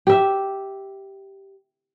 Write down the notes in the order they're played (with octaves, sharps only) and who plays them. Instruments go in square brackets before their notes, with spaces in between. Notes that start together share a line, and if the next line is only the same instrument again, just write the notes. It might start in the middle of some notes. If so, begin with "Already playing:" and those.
[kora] G4 E5